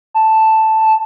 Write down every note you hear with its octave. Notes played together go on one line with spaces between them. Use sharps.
A5